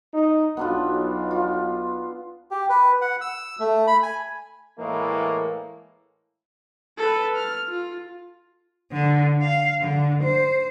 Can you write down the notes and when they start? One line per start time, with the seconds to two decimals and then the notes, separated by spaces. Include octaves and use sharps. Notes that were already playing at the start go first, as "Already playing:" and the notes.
0.14 D#4
0.57 B1 B3 D4 F4
1.31 F4
2.51 G4
2.69 B4
3.01 F#5
3.21 E6
3.60 A3
3.87 B5
4.03 G#5
4.78 A2 E3 G#3 A#3
6.98 A4 B4
7.36 F6
7.68 F4
8.93 D3
9.41 F5
9.81 D3
10.24 C5